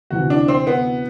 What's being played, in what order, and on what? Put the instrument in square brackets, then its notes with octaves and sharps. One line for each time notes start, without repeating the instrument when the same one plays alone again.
[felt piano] D2 C3 E3 [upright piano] F#4
[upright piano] D4
C4
B3